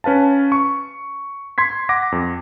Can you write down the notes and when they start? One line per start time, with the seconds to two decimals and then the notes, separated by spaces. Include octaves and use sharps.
0.04 C#4 B4 F5 A5
0.52 C#6
1.58 C6 G#6 B6
1.89 F#5 D6 A#6
2.12 F2